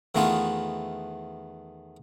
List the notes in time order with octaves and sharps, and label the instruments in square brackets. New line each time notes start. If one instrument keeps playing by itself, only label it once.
[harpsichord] E2 D#3 E3 A3 B3 F4